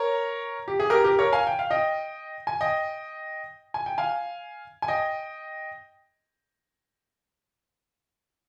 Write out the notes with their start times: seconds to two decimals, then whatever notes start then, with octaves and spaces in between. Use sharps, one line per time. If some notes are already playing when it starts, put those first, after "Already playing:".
Already playing: A#4 C#5
0.68 G4
0.80 G#4
0.90 G4 A#4
1.04 G4 A#4
1.19 A#4 C#5
1.33 F5 G#5
1.47 G5
1.59 F5
1.71 D#5 G5
2.47 G#5
2.61 D#5 G5
3.74 G#5
3.86 G5
3.98 F5 G#5
4.82 G#5
4.88 D#5 G5